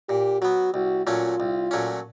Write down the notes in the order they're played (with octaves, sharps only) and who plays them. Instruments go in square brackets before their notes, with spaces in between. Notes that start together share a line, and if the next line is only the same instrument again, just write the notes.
[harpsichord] A#2 [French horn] G4
[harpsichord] F#3 B3 [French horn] F#4
[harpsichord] C2 [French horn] F#4
[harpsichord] A#2 F#3 A3 C#4 [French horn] F4
[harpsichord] C2
A#2 F#3 A3 C#4